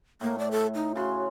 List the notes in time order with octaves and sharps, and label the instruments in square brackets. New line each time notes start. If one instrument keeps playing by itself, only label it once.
[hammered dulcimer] A2 [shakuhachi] A#3
[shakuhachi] D5
A4
D#4
[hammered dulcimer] C#3 C6 [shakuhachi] F#4